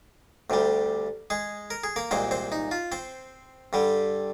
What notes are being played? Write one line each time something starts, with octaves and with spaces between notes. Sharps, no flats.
D2 C3 G3
G#3 G#4
A#4
G#4
A#3 A#4
C2 A#2 G#3 C4 C5
C4 C5
D#4
F4
C4 C5
G2 D3 G3